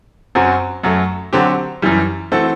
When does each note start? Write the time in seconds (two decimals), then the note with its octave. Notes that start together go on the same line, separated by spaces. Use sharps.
0.35 F#2 F#3 C4 F#4
0.84 F#2 F#3 A3
1.33 D3 F#3 C4 G4
1.82 F#2 E3 G3
2.32 E3 A3 C4 F#4 A4